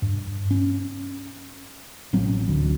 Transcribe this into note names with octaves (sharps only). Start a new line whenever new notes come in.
G2
C#4
A1 F#3 C4 C#4
D2